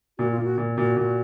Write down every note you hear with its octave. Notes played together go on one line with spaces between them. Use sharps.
A#2 F#4
F4
A#2
F#4
A#2
A#2 F#4
A#2